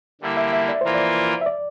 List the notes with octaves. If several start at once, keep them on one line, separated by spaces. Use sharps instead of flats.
D3 G3 A#3 E4
E5
E5
D5
E3 A#3 F4 A#4 C5
D5
E5
D5